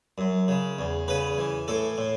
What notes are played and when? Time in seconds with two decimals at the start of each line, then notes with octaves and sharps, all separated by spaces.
0.18 F#2
0.48 C#3
0.79 E2
1.08 C#3 B4
1.38 E3
1.68 A2 A4
1.98 A2